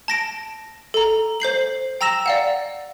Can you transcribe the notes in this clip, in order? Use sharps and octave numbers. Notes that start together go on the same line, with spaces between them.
A5 A#6 D7
A4 A#5
C5 G6 C7 F#7
G5 A#5 E6 A#6 E7
D5 F5 F#5